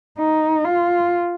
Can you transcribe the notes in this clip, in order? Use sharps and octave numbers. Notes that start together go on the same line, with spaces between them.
D#4
F4